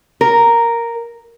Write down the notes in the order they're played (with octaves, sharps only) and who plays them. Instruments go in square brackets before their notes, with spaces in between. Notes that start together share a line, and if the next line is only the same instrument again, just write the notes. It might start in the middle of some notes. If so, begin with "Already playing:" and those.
[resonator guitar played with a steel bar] A#4